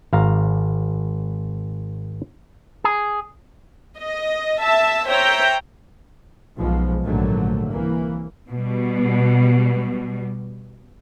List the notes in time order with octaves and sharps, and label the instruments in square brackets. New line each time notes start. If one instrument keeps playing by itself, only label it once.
[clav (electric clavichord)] G#1 F5 A#5
[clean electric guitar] G#4
[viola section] D#5
E5 A5
C5 C#5 E5 G5 A#5
[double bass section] B1 F3 G#3
A#1 G#2 D3 D#3 F#3 A3
C2 E3 A#3
[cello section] B2 G3